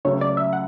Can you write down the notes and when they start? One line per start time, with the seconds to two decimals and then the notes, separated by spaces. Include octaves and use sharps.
0.05 C#2 C#3 F#3 A3 C#5
0.21 D5
0.37 E5
0.53 F#5